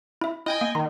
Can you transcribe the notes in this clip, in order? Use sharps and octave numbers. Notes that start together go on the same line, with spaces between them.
E4 E5
E4 D#5 G5 G#5
A#3
D#3 C6